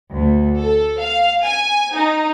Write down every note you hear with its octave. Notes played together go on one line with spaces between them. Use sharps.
D2
A4
F5
G#5
D#4